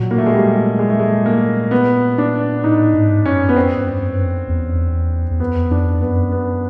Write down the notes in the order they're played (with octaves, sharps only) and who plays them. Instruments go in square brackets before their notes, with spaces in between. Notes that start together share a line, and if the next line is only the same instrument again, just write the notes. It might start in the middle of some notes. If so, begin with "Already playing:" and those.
Already playing: [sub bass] A#2 [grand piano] F#3
[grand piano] A#3
A3
G#3
G3
G#3
A3
G#3
A#3
B3
D4
[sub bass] A2 [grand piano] D#4
[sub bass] G#2
[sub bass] F#2 [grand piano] C#4
[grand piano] B3
[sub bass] F2 [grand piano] C4
[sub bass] G2
F#2
F2
E2
E2
[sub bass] F2 [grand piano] B3
[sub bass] F2 [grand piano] D4
[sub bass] F#2 [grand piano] B3
[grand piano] B3